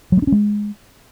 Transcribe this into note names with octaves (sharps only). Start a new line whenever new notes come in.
F#3
A3
D4
C#4
G#3